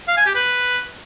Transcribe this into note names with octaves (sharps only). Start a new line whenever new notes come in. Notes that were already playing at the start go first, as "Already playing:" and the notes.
F5
G#5
G4
B4